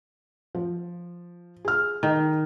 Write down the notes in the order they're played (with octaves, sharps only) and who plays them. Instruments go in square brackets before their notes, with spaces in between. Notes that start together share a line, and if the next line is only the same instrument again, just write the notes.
[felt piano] F3
G#4 F6
[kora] D#3